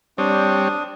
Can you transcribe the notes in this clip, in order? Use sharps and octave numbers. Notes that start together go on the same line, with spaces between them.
G3 C4 D4 C#5 D#6